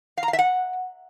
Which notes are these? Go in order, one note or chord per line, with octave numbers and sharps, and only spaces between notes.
F5
A#5
F5
E5
F#5